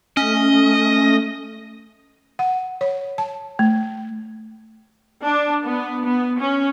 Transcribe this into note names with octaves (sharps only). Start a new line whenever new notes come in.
A3 C#4 D#5
F#5
C#5
A5
A3
D4
B3
B3
C#4